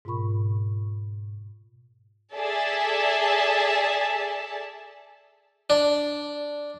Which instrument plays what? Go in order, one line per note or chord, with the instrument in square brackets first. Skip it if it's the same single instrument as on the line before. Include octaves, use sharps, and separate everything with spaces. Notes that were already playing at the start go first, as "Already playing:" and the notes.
[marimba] G#2 B2 F4 A#4 B5 C#6
[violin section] G#4 A4 D5 E5 A5
[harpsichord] D4